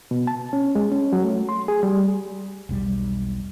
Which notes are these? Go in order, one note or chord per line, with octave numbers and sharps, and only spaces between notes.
B2
A5
C#4
G#3
C#4
F#3
A3
C6
G#4
G3
E1 B1 G3